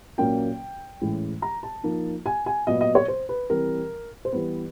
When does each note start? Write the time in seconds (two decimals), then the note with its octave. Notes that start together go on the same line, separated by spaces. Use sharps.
0.18 A#2 F#3 A#3 C#4 G5
1.01 A2 E3 G#3 C#4 E4
1.42 A#5
1.63 A5
1.84 F3 A#3 D#4
2.26 G#5
2.46 G#5
2.67 A#2 F#3 B3 D#5
2.81 D#5
2.95 C#5
3.08 C5
3.29 B4
3.50 C3 E3 G3 C4 A#4
4.25 C5
4.32 E3 G3 B3 B4